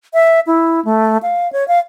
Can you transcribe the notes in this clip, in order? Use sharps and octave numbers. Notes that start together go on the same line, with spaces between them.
E5
E4
A3
F5
C#5
F5